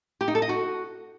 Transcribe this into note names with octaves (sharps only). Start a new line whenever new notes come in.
G4
D#4
A4
D#5
F#4